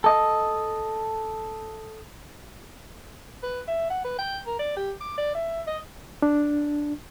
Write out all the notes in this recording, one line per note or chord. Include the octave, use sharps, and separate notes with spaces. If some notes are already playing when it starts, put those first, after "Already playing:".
A4 D#5
B4
E5
F#5
B4
G5
A#4
D5
G4
D6
D5
E5
D#5
D4